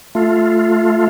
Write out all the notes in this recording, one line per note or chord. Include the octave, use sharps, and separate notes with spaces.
A3 F4